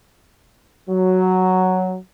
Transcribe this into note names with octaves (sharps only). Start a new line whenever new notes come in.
F#3